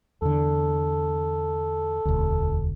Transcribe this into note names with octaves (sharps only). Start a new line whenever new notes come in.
E2 D3 A4
E1 D2